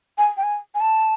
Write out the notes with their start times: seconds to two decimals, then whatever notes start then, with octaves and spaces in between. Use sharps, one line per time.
0.18 G#5
0.37 G5
0.43 G#5
0.75 G#5
0.81 A5